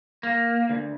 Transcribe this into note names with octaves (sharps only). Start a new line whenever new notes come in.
A#3
D2